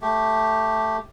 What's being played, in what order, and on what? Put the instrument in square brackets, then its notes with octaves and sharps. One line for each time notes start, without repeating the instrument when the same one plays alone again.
[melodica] A3 G4